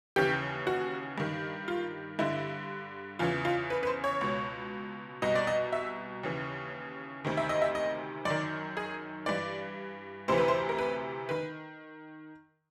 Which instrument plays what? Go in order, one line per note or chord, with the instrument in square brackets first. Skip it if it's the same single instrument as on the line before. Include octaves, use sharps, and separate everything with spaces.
[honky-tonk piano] D#2 C#3 E3 G4
F#4
G2 D#3
F4
G2 D3 E4
E2 C#3 E3 F4
F4
B4
B4
C5
C#5
C#2 B2
C2 B2 D#5
D5
D#5
E5
D#2 C#3 E3
D2 C3 D#3
E5
D#5
E5
D#5
F#2 D#3 D5
G#4
G2 E3 D5
D2 C3 E3 C5
B4
C5
A#4
B4
D#3 B4